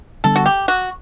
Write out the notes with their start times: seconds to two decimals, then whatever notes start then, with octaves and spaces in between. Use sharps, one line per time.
0.24 D3 G3 B3 D4 A4
0.36 F#4
0.46 G4
0.68 F#4